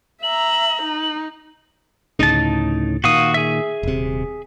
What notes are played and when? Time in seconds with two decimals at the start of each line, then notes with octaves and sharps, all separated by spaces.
0.22 E5 A#5 F#7
0.83 D#4
2.19 D2 A2 C#3 D#4 A5
3.04 A#2 D#3 F#4 F5 D#6
3.34 G#4 E5
3.83 D#1 C3